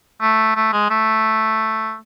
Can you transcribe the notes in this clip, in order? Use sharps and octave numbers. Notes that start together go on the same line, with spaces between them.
A3
A3
G#3
A3